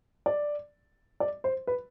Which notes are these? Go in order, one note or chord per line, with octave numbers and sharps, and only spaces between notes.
D5
D5
C5
B4